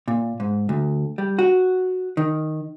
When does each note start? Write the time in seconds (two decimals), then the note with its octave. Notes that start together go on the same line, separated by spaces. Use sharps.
0.08 A#2
0.40 G#2
0.69 D2
1.18 G3
1.39 F#4
2.17 D#3